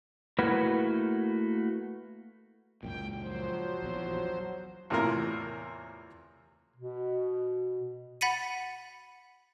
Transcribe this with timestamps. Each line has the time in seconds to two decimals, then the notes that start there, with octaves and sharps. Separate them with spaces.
0.39 A3 A#3 E4 F#4 A#4 B4
2.83 C#2 F#2 A#2 G5
3.22 F3 F#3 C5
3.82 A#1 E2
4.90 E2 A2 C3 A#3 F4 A#4
6.76 B2
8.21 F#5 B5 A6 B6 C#7 D#7